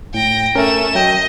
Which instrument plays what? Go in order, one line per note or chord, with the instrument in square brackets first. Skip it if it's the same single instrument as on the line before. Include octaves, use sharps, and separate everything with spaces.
[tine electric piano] A2 [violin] G5 A#6
[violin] A3 E7 [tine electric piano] C#4 A#4
[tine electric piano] F#3 G5 [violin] D#5